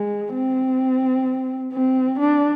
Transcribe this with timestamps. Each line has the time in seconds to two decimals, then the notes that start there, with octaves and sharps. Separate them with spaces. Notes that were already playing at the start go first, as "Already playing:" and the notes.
Already playing: G#3
0.34 C4
1.73 C4
2.20 D4